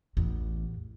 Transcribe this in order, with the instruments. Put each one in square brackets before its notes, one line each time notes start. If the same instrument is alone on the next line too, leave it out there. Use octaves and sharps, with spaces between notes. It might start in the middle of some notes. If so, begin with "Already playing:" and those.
[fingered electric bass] A1 [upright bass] E2